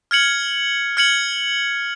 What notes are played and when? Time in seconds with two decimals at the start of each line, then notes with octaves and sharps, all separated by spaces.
0.11 F6 G#6 C#7 F#7
0.97 F6 G#6 C#7 F#7